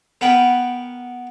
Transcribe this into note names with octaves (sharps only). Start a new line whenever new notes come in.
B3 A#4 F#5 G5 B5